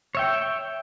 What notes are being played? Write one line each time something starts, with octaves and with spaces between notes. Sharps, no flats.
C#5 E5 G5